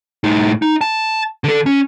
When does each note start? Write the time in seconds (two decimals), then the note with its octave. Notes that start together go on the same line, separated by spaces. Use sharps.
0.24 A2 D#4
0.62 D#4
0.81 A5
1.44 D3 A4
1.66 C#4